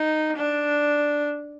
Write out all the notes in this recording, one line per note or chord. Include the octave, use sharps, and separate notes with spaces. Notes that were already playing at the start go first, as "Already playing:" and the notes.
Already playing: D#4
D4